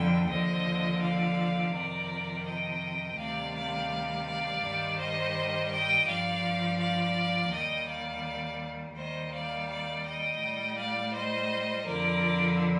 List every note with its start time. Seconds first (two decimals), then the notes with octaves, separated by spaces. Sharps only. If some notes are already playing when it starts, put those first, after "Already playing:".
Already playing: F2 D3 F3 G5
0.28 D#2 D3 F3 C5 D#5
1.01 D5 F5
1.73 F2 C3 D#3 A#4 D5
2.45 D#5 G5
3.17 D2 C3 D#3 G3 D5 F5
3.54 D5 F5
4.26 D5 F5
4.63 G2 D#3 G3
4.98 C5 D#5
5.71 D#5 G5
6.06 G2 F3 D5 F5
6.79 D5 F5
7.51 D#2 D#3 G3 D#5 G5
7.88 D5 F5
8.96 D#2 D#3 G3 C5 D#5
9.32 D5 F5
9.68 D5 F5
10.05 D#5 G5
10.41 A2 G3
10.77 D5 F5
11.13 C5 D#5
11.85 F2 D3 F3 A#4 D5